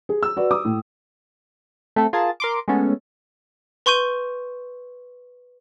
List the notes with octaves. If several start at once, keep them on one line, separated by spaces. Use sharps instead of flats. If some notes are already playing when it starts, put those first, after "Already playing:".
G#4
E6
F#4 B4 D5
D6 D#6
A2
A3 C4 A4
F4 G#4 A#4 A5
A#4 C6 D6
G#3 A3 B3 C#4 A4
B4 C6 C#6 G6 D#7